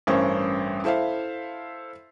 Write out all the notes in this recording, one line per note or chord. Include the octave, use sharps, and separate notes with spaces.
A1 G2 C#4 A#4 C5
E4 A4 C5 E5 F5